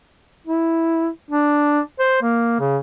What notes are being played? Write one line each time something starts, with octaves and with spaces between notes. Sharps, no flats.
E4
D4
C5
A#3
C#3